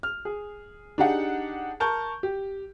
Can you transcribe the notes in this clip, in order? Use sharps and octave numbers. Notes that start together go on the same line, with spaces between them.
F6
G#4
D4 D#4 G4 G#4 F#5
A#4 A5 C#6 G6
G4